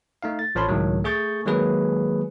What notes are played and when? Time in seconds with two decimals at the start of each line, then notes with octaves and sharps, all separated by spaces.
0.23 A3 D#4 F5
0.39 A6
0.55 A1 F3 C#5 A5 B5 C6
0.68 C#2 A2 D#3 F#3
1.04 A3 G#4 C#6 G6 A6
1.46 D#3 F#3 G#3 A#3 G#4 B4